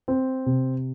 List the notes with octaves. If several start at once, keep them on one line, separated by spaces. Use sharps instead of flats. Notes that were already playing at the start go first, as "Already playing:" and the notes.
C4
C3